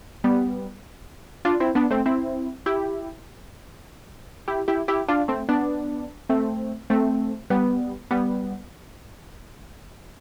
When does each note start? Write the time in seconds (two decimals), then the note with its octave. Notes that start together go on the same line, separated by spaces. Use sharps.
0.24 G3 B3
1.45 D4 F4
1.60 C4 E4
1.75 B3 D4
1.91 A3 C4
2.06 C4 E4
2.66 E4 G4
4.48 E4 G4
4.68 E4 G4
4.88 E4 G4
5.08 D4 F4
5.28 A3 C4
5.49 B3 D4
6.29 A3 C4
6.90 A3 C4
7.50 G3 B3
8.11 G3 B3